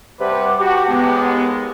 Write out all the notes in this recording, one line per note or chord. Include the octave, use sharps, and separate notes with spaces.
C3 G3 B4 F#5 A5 D6
F#4 G4
D#2 G#3 B3